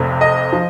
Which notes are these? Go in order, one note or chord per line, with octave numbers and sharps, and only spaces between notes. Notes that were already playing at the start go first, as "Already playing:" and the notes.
Already playing: F1 F2 C3
D#5
F3